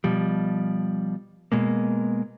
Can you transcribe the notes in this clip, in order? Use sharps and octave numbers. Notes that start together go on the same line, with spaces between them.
B2 F3 G3
B2 G#3 A#3